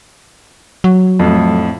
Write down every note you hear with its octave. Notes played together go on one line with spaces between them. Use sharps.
F#3
F2 A2